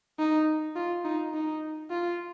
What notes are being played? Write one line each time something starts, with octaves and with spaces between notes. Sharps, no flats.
D#4
F4
D#4
D#4
F4